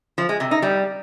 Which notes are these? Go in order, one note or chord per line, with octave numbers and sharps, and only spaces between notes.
F3
G#3
C3
D#4
G3